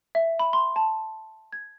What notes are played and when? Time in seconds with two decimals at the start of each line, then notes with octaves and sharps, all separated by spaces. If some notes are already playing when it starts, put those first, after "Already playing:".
0.15 E5
0.39 B5
0.53 C6
0.76 A5
1.52 G#6